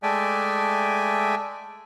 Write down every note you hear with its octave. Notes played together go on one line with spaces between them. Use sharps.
G#3 A3 D5 E5 G5 G#5